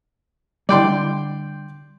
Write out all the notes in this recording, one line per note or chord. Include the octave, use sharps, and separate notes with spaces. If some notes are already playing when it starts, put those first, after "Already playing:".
D3 G3 D5 G5 C6